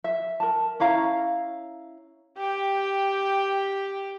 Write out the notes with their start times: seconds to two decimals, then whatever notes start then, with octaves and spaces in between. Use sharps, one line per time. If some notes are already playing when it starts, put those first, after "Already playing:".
0.04 E5
0.40 A#4 A5
0.80 C#4 E4 F5 A#5
2.37 G4 G5